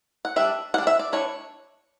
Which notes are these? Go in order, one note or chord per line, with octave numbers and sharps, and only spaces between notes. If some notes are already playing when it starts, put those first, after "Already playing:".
F#5
G3 D4 E5
G3 D4 F#5
E5
D5
E3 A3 D4 C#5